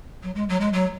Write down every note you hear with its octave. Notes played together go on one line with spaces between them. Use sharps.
F#3
G#3
F#3
G#3
F#3